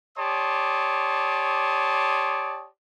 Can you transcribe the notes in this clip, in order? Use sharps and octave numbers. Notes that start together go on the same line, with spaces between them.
G4 C#5 D5 A5 C6 D#6